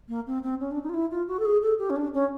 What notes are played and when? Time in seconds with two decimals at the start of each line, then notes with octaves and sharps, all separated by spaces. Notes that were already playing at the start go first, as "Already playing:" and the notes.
0.08 A#3
0.26 C4
0.42 C4
0.60 C#4
0.71 D4
0.83 D#4
0.89 F4
0.94 E4
1.11 F4
1.27 F#4
1.39 A4
1.45 G#4
1.62 A4
1.78 G4
1.89 C#4
1.96 D4
2.13 C#4